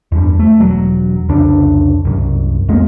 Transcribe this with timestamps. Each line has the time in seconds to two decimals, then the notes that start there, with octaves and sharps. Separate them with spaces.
0.12 E2 G2
0.39 A3
0.60 E1 F#3
1.29 C2 F2 C#3 D4
2.05 C2 F#2
2.69 F2 G#3 A#3 B3